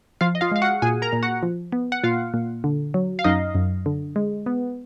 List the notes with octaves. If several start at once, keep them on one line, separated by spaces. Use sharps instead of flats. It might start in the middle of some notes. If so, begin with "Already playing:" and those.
F3 F4 F5
D#5
F4 F5
G#3 F5
F#4 F#5
A#2 G#4 G#5
A#4 A#5
A#2
F#4 F#5
F3
B3
F#5
A#2 F4 F5
A#2
D3
F#3
F5
F#2 D#4 D#5
F#2
D3
G#3
B3